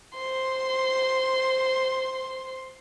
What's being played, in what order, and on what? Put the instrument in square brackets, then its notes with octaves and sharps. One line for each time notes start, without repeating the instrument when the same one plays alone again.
[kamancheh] C5 C6